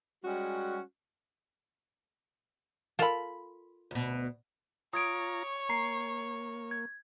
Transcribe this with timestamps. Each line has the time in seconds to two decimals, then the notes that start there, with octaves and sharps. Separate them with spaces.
0.24 G3 G#3 C#4 F#4
2.99 F4 A4 A#4 B5
3.91 D2 B2
4.93 F4 C#5 A#5 D#6 G#6 D7
5.69 A#3 A#5 C7
6.71 G#6